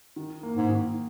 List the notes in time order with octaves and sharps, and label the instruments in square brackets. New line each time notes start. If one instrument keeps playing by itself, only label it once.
[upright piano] D#3
A#3
[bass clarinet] G#2
[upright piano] D#3